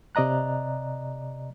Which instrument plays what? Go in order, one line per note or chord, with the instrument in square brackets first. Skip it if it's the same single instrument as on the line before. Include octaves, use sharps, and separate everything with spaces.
[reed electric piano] C3 D5 D#5 A#5 F#6